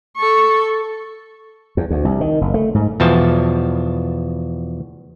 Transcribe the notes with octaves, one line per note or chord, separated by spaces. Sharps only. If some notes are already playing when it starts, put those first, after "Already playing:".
A4 C#6
E2
D2
C2
D#3
F#1
A3
G#2
E2 B2 F3 A5